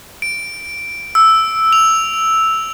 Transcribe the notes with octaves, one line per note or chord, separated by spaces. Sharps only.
D7
E6
F7